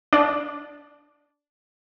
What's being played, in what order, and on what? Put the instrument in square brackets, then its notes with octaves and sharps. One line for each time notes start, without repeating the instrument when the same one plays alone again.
[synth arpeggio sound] D4 D5